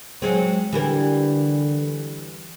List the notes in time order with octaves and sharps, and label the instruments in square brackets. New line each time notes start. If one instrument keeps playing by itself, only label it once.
[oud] F#3 G#3 C4
[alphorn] D3 [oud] E3 G3 A#4